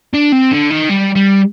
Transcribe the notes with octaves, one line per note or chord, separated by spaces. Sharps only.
D4
C4
D3
D#3
G3
G3